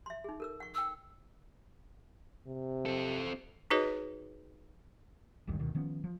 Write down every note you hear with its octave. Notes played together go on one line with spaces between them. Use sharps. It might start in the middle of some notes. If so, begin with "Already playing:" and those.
E5 C6
D#4 G#4
A4 A#4 E6
F#5 C#6
G5 C#6 E6
C3
C4 A4
D#4 F#4 G#4 B4 C#5 D#5
G#1 D2 G2 D#3
D2 B2 D#3
D#3 F3 B3 C#4
F3